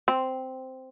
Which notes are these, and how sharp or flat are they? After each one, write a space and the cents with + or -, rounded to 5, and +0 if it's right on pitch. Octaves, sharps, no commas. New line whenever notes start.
C4 -5